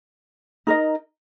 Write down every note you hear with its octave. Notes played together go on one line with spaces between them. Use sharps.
D#4 A#4 D#5